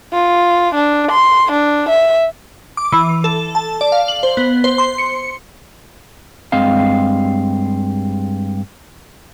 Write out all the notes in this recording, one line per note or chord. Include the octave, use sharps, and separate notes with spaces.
F4
D4
C6
D4
E5
D6
E3
A4
A5
D5
F5
F#7
C5
B3
C5
C6
C#7
G2 G#3 C4 D#5 F5